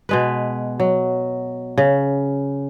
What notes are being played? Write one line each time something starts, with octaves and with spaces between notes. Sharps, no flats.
B2 G#3 B4
F#3
C#3